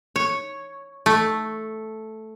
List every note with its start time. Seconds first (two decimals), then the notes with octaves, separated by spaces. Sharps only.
0.16 C#5
1.06 A3